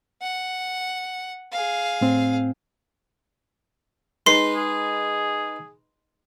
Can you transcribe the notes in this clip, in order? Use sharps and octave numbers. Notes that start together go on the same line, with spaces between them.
F#5
G#4 F5
A2 C4
G#3 D#4 B4 C6 C7
G#4